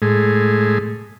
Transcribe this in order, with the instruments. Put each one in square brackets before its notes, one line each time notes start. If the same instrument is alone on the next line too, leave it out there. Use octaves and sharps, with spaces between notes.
[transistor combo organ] A2 G#3